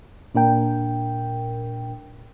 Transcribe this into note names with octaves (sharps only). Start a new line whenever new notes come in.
A#2 D4 A#4 G5